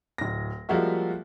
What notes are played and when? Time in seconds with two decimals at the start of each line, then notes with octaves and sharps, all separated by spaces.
0.18 D1 A#6
0.69 F3 G3 G#3 A#3 F#4 E5